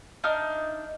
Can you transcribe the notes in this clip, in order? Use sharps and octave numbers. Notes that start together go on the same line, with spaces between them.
D4 D#4 E5 F6